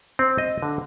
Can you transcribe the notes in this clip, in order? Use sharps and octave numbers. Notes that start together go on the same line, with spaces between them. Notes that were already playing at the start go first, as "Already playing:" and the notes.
C4
D#5
D3